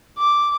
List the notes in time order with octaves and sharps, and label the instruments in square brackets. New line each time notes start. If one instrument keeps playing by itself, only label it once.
[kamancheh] D6